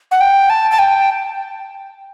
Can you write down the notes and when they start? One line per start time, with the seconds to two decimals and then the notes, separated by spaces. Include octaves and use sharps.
0.11 F#5
0.21 G5
0.50 A5
0.71 A5
0.79 G5